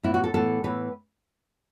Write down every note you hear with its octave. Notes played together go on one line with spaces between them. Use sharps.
A2 E3 B3 E4
F#4
A4
A2 E3 B3 A4
A2 E3 B3 B4